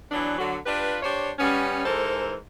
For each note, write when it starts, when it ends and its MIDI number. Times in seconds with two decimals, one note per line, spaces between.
0.12 0.35 52
0.12 0.35 54
0.12 0.35 59
0.12 0.35 62
0.38 0.57 50
0.38 0.57 54
0.66 0.99 62
0.66 0.99 65
0.66 0.99 67
0.66 0.99 71
1.03 1.31 62
1.03 1.31 67
1.03 1.31 72
1.03 1.31 73
1.39 1.83 55
1.39 1.83 59
1.39 1.83 61
1.86 2.36 44
1.86 2.36 52
1.86 2.36 69
1.86 2.36 70
1.86 2.36 72